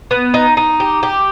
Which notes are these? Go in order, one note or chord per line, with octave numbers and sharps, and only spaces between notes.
B3
D#4
D#4
G4
G4